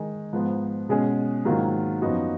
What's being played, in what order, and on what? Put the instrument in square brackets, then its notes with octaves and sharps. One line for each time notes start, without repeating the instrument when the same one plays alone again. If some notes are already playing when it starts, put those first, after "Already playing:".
Already playing: [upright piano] D#3 G#3 D#4 G#4
G#2 F3 B3
B2 G#3 C#4 G#4
G#2 D#3 F#3 A#3 F4
F#2 F3 B3 D#4 F#4